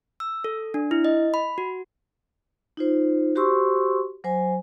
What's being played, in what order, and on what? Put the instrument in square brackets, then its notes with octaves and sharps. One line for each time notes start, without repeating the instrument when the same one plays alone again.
[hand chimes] E6
A4
D4
E4
D#5
B5
F#4
[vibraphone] D#4 F4 C5
F#4 G4 C5 C6 C#6 E6
F#3 C5 G#5